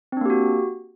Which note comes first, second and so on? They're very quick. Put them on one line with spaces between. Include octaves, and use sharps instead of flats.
C4 D4 A#3 G4 F#4